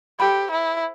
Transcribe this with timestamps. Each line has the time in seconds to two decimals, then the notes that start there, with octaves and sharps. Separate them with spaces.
0.19 G4 A4 C5 G5 B5
0.51 E4